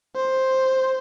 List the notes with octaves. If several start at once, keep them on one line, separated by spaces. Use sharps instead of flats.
C5